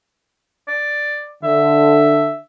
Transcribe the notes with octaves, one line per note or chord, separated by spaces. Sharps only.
D5
D3 E5